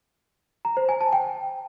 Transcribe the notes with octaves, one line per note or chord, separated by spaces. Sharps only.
A#5
C5
G#5
A5
G5